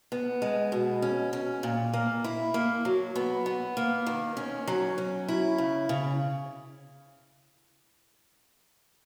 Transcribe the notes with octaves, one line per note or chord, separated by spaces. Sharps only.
B3
G#3
B2
C#4
C#4
A#2
A#3
E4
A#3
F#3
B3
B3
A#3
D#3
C#4
F#3
C#4
E4
C#3
C#3